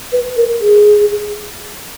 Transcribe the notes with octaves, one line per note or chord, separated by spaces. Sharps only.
B4
A#4
G#4